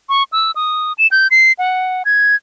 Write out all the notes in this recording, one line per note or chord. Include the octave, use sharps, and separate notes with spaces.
C#6
E6
D#6
E7
G6
C7
F#5
G#6